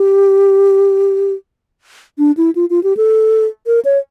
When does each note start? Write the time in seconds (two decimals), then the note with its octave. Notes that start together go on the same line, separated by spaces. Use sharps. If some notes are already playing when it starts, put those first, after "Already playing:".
Already playing: G4
2.19 D4
2.37 E4
2.55 F4
2.70 F4
2.84 G4
2.97 A4
3.67 A#4
3.85 C#5